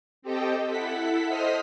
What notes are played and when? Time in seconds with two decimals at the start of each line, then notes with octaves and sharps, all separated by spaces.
0.22 C4 G4 A4 D#5 G5
0.67 E4 A4 F#5 B6
1.28 C5 D#5 D#6 F6 B6